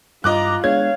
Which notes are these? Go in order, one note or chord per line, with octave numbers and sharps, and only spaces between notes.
G2 F4 D#5 A#5 D6 F#6
G#3 B3 D4 C#5 F5 G#6